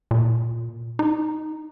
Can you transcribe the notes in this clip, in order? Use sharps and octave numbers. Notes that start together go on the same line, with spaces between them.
A#2
D#4